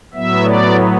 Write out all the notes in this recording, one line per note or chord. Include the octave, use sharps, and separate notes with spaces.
A2 F#3 B3 E5
D5